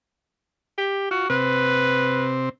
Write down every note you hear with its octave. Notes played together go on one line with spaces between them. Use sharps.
G4
F4 F#4
C3 C4 B4